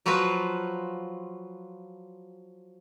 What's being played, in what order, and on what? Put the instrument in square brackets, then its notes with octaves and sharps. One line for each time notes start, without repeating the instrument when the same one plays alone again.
[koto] F3 F#3 F4 F#4 B4